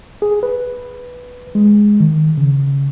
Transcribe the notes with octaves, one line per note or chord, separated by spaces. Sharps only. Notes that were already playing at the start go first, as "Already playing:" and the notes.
G#4
B4
G#3
D#3
C#3